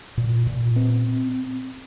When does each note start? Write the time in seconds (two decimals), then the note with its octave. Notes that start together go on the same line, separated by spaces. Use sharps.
0.17 A#2
0.47 A#2
0.76 C4